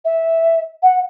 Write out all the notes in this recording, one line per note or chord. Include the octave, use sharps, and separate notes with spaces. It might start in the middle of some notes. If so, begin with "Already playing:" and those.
E5
F#5